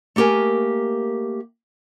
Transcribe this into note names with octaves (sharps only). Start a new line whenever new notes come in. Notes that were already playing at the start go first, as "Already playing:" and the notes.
A3 A#3 G4 A#4 G#5